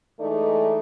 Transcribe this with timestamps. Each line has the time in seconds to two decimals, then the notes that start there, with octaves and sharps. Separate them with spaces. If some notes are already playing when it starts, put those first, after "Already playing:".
0.20 E3 G#3 A3 D#4 D5